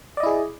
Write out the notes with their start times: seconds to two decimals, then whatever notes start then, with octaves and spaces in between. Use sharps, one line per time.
0.17 D5
0.20 D#5
0.23 E4
0.26 G#4